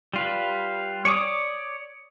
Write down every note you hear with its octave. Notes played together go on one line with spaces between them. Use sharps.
G3 F4 B4
C#5 D5 G#5 D6 D#6